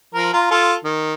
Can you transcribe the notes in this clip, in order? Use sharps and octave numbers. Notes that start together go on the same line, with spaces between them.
F3 A#4
F4 A#5
F4 A4
D#3